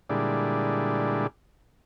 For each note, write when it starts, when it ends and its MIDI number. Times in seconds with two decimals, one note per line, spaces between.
0.10 1.27 46
0.10 1.27 50
0.10 1.27 55
0.10 1.27 56
0.10 1.27 62
0.10 1.27 64